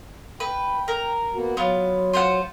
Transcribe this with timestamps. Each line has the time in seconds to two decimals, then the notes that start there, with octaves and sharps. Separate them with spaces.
0.40 B4 G5
0.88 A#4
1.34 A#3 B3 F#4
1.57 F#3 B3 F4
2.13 F4 C5 F#5